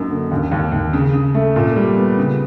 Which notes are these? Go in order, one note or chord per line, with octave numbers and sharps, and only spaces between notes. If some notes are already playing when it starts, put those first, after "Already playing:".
Already playing: F#2 A#3 D#4
D3
D#2
D#2
D#2
C#3
C#3
A3
A#2
G3
B3
C#3